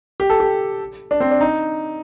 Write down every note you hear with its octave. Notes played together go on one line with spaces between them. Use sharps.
G4
A4
G4
D4
C4
D4
D#4